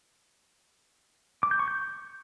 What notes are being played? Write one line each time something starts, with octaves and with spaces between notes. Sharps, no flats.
D6
G6
C#6
G6